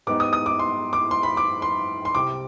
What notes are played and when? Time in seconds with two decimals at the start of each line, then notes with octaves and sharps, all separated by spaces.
0.07 G#2 G3 B3 D#4 D6
0.20 D#6
0.33 D#6
0.46 D6
0.59 C6
0.93 D6
1.11 C6
1.23 B5
1.37 D6
1.62 C6
2.05 C6
2.14 C2 C3 G3 C4 D6